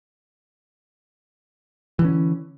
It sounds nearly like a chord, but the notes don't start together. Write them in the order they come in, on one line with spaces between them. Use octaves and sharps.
E3 D3 C#4